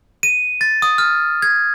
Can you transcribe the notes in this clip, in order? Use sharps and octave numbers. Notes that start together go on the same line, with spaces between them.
D#7
A6
D#6
F6
G#6